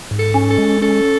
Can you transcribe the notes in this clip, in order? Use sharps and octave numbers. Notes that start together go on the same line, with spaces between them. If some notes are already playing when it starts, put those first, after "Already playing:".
G#2
A4
C#4
A4
G#3
C#4 A4